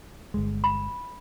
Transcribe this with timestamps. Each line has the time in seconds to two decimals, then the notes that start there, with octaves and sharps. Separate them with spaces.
0.34 G1 G#3
0.64 B5